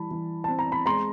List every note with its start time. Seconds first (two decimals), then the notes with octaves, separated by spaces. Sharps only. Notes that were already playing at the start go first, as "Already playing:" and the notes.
Already playing: E3 G3 A5 B5
0.11 E3
0.44 C4 A5
0.59 A#5
0.72 B5
0.86 G#3 A#5 C6